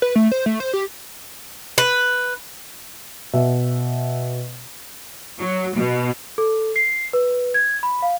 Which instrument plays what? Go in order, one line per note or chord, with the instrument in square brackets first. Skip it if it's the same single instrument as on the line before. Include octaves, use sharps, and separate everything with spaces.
[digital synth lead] B4
A3
C5
A3
C5
G4
[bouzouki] B4
[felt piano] B2 E5
[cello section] F#3
B2
[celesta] A4
C7
B4
G#6
B5
F5